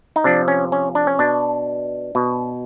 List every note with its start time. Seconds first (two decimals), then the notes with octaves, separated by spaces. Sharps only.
0.16 D#4
0.24 C3 F3 D4
0.48 C#4
0.72 C#4
0.95 D4
1.07 C#4
1.19 B2 D4
2.15 B2